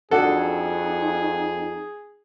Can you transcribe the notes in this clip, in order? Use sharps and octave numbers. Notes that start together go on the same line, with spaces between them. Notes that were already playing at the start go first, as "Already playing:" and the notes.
F2 D4 D#4 F#4 G#4 A4